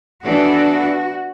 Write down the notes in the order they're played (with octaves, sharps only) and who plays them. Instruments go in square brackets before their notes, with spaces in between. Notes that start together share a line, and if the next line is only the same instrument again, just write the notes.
[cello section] E3 B3 D4 A4 [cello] F#4